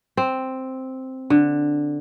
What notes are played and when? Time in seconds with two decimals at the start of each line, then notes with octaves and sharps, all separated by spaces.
0.17 C4
1.30 D3